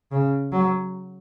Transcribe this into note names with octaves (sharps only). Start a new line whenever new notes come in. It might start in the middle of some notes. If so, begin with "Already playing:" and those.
C#3
F#3